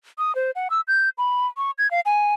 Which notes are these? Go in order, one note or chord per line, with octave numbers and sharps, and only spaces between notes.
D#6
C5
F#5
E6
G6
B5
C#6
G#6
F5
G#5